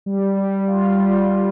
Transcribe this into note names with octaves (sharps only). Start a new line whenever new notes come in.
G3
G3
F4
G3
G3